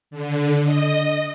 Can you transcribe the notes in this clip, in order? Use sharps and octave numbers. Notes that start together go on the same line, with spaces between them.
D3
D#5